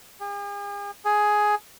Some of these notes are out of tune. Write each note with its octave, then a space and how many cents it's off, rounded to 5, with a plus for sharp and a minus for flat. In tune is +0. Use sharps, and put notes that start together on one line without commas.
G#4 -45
G#4 +10